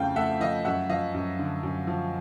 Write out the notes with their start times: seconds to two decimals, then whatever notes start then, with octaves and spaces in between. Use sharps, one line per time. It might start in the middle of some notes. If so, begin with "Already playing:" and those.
Already playing: F2 C#3 F3 A3 F5 G5
0.16 A3 E5 F#5
0.41 F3 D#5 F5
0.65 F#2 E5 F#5
0.89 F3 D#5 F5
1.14 F#2
1.39 D3
1.63 F#2
1.87 F3